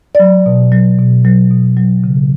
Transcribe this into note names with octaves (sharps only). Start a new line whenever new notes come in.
F#3 D5
B2
F#3
B2
F#3
B2
F#3
C#3